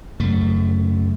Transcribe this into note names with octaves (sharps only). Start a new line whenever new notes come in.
F#2 C#3 A3